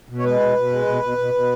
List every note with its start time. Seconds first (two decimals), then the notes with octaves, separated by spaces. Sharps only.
0.09 B2
0.19 C#5
0.24 G#3 B4
0.40 B2
0.56 B2
0.71 G#3
0.86 B2
1.02 B2
1.18 B2
1.34 B2